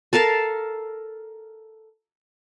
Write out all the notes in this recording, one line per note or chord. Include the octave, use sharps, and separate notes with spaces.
A4 A#4 F5 A5